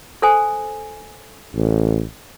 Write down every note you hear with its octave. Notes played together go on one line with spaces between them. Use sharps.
A4 C5 G#5
A1